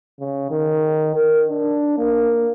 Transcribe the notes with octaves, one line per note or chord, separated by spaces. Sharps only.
C#3
D#3
A#4
D4
A#3